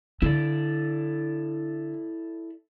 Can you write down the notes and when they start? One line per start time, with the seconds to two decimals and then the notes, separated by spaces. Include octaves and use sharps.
0.22 D3 E4 A4 D5